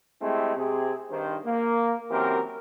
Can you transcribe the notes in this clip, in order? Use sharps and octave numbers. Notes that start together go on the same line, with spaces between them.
G#3 A3 C4 E4 G4 G#4
C3 C4 G#4
G2 D#3 C5
A#3
F#2 E3 C4 G4 A#4